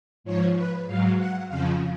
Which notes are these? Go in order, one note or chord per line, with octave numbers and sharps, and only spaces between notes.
G#2 F3 C#5
B4
G#2 F#3 F5
F#5
F2 C#3 F3 F5